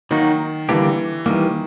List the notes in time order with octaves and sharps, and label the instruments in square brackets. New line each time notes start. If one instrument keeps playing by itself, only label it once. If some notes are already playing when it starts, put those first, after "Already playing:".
[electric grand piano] D#3 [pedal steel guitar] F#3 A#3 D#4 F#4
[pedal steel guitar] D3 G3 A#3 D4 G4 [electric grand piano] E3
[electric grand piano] D#3 [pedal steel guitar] E3 G3 A#3